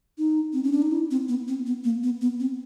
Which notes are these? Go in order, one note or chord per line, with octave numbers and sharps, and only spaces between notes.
D#4
C4
C#4
D4
D#4
E4
C4
B3
C4
B3
A#3
B3
B3
C4